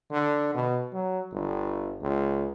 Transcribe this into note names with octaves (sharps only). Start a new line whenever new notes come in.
D3
B2
F#3
G1
C#2